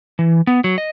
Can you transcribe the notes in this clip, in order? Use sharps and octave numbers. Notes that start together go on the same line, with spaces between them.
E3
B3
F#3
D#5